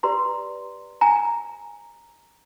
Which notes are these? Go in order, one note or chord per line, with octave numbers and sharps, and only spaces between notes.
G4 B4 D5 A#5 C6
G#5 A#5